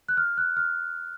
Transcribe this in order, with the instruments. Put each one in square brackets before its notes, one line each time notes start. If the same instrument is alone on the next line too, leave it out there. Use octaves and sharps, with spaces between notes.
[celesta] F#6
F6
F#6
F6